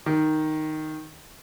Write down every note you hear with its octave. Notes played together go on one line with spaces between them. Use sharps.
D#3